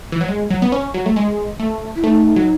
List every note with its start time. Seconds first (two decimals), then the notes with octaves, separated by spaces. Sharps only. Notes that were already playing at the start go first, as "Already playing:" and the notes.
0.12 E3
0.21 F#3
0.28 G#3
0.50 F#3
0.62 B3
0.72 C#4
0.94 F#3
1.06 A3
1.16 G#3
1.60 A3
1.96 E4
2.04 A3 D#4
2.36 F#3